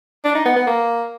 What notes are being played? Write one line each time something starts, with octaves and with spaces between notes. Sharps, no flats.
D4
D#4
B3
B3
A#3